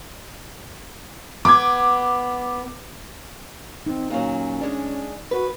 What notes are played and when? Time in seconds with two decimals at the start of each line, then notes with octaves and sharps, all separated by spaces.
1.45 B3 D6 G#6
3.87 C4 D#4
4.10 A#2 F#3 C#4
4.61 G#3 D4
5.31 F#4 B4